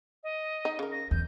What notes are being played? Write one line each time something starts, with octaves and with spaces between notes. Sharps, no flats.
D#5
D#4
C#3 A#4
A#6
E2 G6